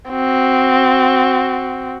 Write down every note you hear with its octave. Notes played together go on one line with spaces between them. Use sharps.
C4 F#4